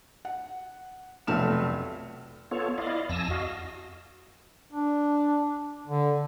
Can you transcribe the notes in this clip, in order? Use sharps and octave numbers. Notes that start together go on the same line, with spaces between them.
F#5
F1 B1 A3 F6 E7
B3 F4 A4 C#5
E4 D5 D#5 F5
F2 G#5 A5 E6 A#6
F#4 D#5 F5
D4
D3